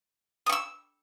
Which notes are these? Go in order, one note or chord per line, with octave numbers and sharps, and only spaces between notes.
C#6 D#6 E6